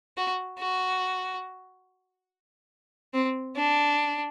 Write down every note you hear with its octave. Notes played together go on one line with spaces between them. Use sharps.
F#4
F#4
C4
D4